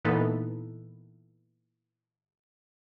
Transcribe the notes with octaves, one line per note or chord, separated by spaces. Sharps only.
A#2 E3 B3 D#4 A4 B4